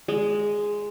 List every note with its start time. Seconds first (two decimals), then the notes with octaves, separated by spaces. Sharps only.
0.08 G#3